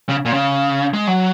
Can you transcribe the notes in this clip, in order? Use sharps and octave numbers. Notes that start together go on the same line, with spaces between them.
C#3
A#2
C#3
G#3
F#3